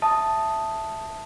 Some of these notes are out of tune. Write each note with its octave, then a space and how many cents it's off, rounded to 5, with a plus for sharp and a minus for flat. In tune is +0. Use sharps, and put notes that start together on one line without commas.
E5 +0 A5 +0 D#6 +0